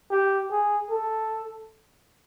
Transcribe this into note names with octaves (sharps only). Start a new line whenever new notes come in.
G4
G#4
A4